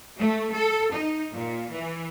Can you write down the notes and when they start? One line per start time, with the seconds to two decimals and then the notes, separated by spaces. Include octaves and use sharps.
0.19 A3
0.53 A4
0.93 D#4
1.33 A#2
1.71 E3